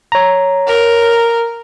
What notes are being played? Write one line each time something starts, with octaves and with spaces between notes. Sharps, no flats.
C#5 A#5
A#4